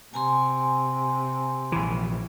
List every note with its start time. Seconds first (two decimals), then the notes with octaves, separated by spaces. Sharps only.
0.14 C3 G#5 A#5 C6
1.72 A#1 E3